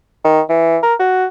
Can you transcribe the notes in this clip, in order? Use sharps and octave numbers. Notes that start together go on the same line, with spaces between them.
D#3
E3
A#4
F#4